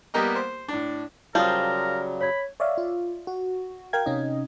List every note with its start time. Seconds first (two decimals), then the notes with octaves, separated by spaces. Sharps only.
0.14 G3 A#3 B3 G4 A#4 D#5
0.35 C5
0.68 A2 D4
1.35 C#3 F#3 G3 F4 A#4 C5 A5 D#6
2.21 C#5 B5 G#6
2.60 C#5 D5 E5 F5
2.78 F4
3.27 F#4
3.93 A#4 F5 G5 G#6
4.06 C3 C#4 D#4 D#5